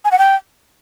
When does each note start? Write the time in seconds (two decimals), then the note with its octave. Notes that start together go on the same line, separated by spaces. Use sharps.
0.05 G#5
0.12 F#5
0.19 G5